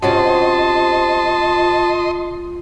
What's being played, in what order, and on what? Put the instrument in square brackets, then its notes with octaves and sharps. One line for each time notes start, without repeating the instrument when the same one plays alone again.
[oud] C3 C#4 F#4 [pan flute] F4 [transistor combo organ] D#5 C6 [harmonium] A5